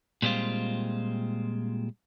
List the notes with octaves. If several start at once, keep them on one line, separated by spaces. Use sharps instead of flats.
A#2 G3 G#3 C4 F4